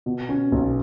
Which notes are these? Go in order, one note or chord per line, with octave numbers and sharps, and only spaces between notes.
B2
C#4
B1